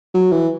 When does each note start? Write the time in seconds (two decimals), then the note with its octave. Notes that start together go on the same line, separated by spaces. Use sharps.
0.14 F#3
0.32 E3